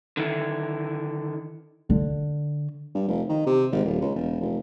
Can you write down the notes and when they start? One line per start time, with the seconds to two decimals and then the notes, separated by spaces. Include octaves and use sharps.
0.17 D3 D#3 E4
1.90 D3
2.94 G2
3.08 F1
3.29 D#3
3.46 C3
3.72 G#1
3.85 D#1
4.01 C#2
4.15 E1
4.40 F1